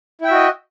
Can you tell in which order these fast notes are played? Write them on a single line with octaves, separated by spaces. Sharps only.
E4 G5 E5 F#4 D#5